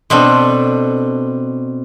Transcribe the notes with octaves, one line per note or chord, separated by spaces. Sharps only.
B2 C4 D4 A4